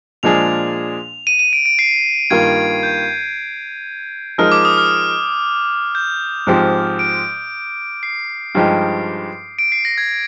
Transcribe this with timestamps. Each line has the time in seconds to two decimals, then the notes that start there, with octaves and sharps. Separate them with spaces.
0.23 A#2 F3 G#3 D4 G#4 F7
1.27 D#7
1.39 D#7
1.53 D7
1.66 D7
1.79 C7
2.30 G2 D#3 A#3 F4 A#4 G#6
2.83 G6
4.38 F3 G#3 D#4 A#4 D#5 F6
4.52 D6
4.65 D#6
4.78 F6
5.95 G6
6.47 G#2 F3 C4 G4
6.99 D7
8.03 C7
8.55 G2 F3 G#3 D#4 G4
9.59 D7
9.72 C7
9.85 A#6
9.98 G#6